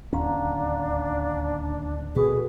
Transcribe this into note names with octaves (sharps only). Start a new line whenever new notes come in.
D1 D#2 C#4 D4 F5 F#5 A#5
B2 F#4 G#4 A4 B4